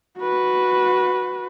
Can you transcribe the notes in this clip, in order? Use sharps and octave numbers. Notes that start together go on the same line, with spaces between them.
F#4 B4